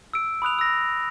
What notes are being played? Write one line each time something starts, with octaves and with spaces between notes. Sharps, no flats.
E6 D7
B5 D#6 F#6 F7
E6 A#6